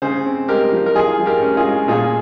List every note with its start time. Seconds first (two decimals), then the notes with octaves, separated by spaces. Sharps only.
0.02 C#3 G#4 C5
0.26 C4
0.48 G#3 G4 A#4
0.72 F3
0.86 A#4
0.95 F3 F4 G#4
1.19 F3
1.26 G4 A#4
1.42 C#4
1.57 F4 G#4
1.65 G#3
1.88 A#2 F4 G#4